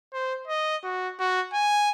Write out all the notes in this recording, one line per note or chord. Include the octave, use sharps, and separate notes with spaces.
C5
D#5
F#4
F#4
G#5